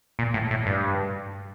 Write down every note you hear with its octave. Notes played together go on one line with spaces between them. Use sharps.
A#2
A2
A2
G2